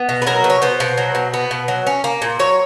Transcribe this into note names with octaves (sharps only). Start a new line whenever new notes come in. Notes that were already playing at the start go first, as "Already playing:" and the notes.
Already playing: B3
B2
B4
F#3 A#4
B2
C#5
B3 C5
B2
F#3
B2
B3
B2
F#3
C#4
A#3
A#2
F#3 C#5